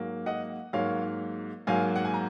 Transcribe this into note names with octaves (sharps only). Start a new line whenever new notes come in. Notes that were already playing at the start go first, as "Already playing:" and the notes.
Already playing: G#2 F#3 A#3
D#5 F#5
G#2 F#3 A#3 C#5 F5
G#2 F#3 A#3 F5 G#5
F#5
G#5
A#5